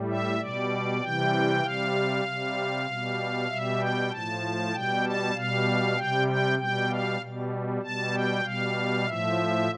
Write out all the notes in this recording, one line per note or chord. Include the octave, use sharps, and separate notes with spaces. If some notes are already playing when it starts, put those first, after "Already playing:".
Already playing: A2 G3
E5
B2 G3 D5
C3 E3 G3 G5
C3 G3 F5
C3 G3
B2 G3
B2 G3 E5
G5
A2 F3 A5
B2 G3 G5
A5
B2 G3 F5
C3 G3 G5
G5
B2 G3 G5
F5
B2 G3
B2 G3 A5
G5
B2 G3 F5
A2 F3 E5